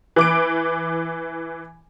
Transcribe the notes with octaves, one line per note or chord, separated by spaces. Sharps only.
E3 D6 D7